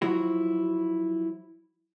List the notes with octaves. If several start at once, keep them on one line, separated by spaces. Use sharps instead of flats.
F3 F#3 E4 F#4